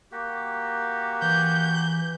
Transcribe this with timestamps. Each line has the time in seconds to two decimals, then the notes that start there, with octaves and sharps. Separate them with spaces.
0.12 A#3 F#4 G4
1.22 E3 G6